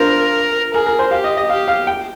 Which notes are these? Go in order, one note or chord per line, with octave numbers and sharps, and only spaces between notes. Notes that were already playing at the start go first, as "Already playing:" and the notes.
Already playing: D4 F4 A#4 C5
G#4 A#4
A#4
C5
G4 F5
D#5
D#5
G4 F5
F5
G5